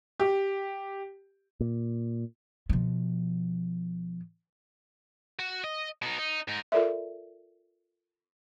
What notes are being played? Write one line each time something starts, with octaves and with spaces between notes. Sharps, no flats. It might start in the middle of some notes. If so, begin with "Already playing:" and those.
G4
A#2
B2 F3
F#4
D#5
B2 D#4
D#4
G#2 D#4
F4 A4 A#4 D5 E5